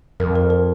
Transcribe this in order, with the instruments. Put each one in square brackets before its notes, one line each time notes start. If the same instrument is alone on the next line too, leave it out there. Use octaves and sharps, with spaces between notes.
[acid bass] F2 [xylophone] A#4
[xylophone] A#4
A#4